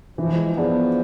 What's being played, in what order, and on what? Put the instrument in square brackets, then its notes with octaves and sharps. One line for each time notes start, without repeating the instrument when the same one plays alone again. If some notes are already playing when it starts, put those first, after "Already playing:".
[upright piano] E3 [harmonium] F3
[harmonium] G#3
F3
[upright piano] B3 D4 G#4